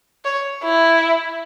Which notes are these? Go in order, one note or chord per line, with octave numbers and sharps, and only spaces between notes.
C#5
E4